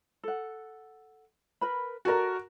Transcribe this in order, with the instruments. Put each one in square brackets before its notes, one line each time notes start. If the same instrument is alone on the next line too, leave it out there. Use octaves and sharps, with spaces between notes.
[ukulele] A4 F#5
A#4 B4 B5
[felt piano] F#4 A#4 [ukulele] A4 D5 A#5